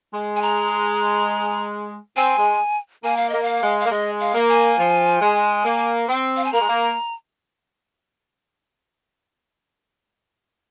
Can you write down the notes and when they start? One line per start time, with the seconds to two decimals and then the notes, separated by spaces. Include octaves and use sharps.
0.13 G#3
0.36 G#5
0.42 A#5
2.16 C4 G#5
2.38 G#3
3.04 A#3 G#5
3.17 F5
3.29 A#3 D#5
3.43 F5
3.62 G#3
3.81 A#3 F5
3.91 G#3 D#5
4.20 F5
4.34 A#3
4.49 G#5
4.78 F3
5.21 G#3
5.65 A#3
6.09 C4
6.37 F5
6.44 G#5
6.53 A#3 A#5
6.61 G#3
6.68 A#3